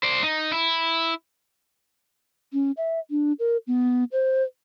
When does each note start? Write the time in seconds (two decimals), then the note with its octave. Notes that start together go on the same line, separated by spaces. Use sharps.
0.03 C5 D5
0.23 D#4
0.52 E4
2.53 C#4
2.77 E5
3.10 D4
3.39 A#4
3.67 B3
4.12 C5